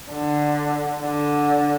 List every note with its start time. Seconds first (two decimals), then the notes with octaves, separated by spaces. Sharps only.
0.11 D3
1.02 D3